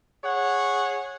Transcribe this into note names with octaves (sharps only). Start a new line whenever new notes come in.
G#4 C#5 F#5